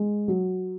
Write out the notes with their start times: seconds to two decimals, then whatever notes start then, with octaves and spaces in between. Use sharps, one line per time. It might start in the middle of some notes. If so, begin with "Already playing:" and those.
Already playing: G#3
0.28 F#3